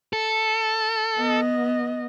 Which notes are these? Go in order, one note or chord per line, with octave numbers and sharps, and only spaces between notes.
A4
B3 D#5